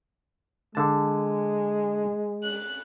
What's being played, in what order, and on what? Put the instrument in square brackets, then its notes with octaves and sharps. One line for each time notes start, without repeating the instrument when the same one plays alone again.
[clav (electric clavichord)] D3 A5 [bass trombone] G#3
[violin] F#6